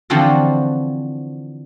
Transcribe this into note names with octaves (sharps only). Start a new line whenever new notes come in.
D3 E3 F3 C4 F#4 A4